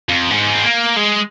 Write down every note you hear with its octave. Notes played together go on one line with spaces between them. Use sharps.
F2
G#2
C4
A#3
G#3